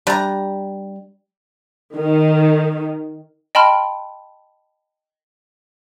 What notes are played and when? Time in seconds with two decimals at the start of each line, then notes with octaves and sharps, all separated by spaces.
0.07 G3 D4 A#5
1.98 D#3
3.55 D#5 G5 A5 B5 C6 F6